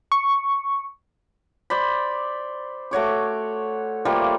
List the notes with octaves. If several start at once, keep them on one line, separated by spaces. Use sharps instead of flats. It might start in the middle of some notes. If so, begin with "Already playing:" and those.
C#6
C5 D5 B5
A3 F#4 C#5 D6
F3 G3 A3 A#3